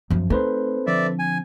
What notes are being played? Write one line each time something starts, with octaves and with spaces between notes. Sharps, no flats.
F#2 F3
A3 C4 D#4 A4 B4 C5 C6
D3 F3 D5 E5
G#5